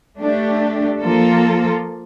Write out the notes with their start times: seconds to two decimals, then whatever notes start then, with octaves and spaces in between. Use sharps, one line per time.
0.18 A3 D4 G4
1.02 F3 A#3 F4 A4